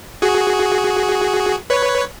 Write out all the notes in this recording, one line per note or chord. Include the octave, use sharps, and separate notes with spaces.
F#4 G#4
B4 C#5